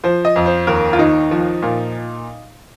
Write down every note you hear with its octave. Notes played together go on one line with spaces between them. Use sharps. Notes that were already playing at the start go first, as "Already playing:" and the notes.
F3 C5
D#5
F2
C5
D#2 A#4
F4
D#3 D#4
F3
A#2